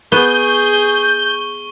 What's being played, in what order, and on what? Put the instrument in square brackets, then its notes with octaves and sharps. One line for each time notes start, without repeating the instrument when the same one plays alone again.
[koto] B3 B4 [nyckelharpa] G#4 [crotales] C#6 G7 [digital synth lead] G6